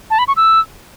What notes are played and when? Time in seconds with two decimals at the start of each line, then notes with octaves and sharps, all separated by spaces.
0.10 A5
0.19 B5
0.28 C#6
0.36 E6